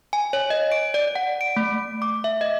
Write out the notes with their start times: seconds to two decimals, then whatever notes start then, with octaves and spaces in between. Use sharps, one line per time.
0.13 G#5
0.33 C#5
0.50 D#5
0.72 D7
0.94 D5
1.15 F#5
1.41 D7
1.56 A3
2.02 D6
2.24 E5
2.41 D#5